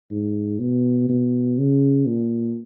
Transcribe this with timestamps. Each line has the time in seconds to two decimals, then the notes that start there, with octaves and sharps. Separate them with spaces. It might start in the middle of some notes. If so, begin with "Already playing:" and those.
0.11 G#2
0.59 B2
1.09 B2
1.58 C#3
2.06 A#2